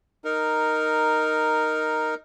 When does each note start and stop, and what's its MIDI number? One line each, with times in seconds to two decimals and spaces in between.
0.24 2.14 63
0.24 2.14 70